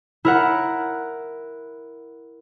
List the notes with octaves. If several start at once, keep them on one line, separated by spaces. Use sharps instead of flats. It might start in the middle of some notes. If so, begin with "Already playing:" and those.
E4 A#4 F#5